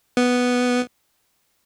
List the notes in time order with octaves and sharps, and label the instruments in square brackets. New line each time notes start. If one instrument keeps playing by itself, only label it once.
[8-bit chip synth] B3